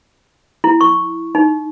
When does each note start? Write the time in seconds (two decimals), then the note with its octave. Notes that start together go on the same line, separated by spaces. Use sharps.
0.64 E4
0.81 C#6
1.35 D#4